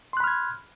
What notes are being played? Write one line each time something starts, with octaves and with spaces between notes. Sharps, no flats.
B5 C6 F6 F#6 G#6